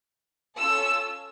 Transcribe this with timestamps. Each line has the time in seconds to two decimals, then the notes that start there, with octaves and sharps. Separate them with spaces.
0.56 C#4 F4 A4 E6